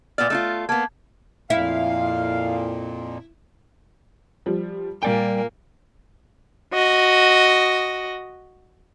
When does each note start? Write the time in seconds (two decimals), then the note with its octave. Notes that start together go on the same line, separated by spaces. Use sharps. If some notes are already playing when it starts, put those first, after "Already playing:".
0.18 A#2 B3 D5 F6 A6
0.30 A3 D#4 F4
0.69 A#3 B3 A5 G#6
1.50 F2 A#2 E4 F5
4.46 F3 G3
5.03 A#2 G3 A#3 D5 G5 G#5
6.73 F#4 D#5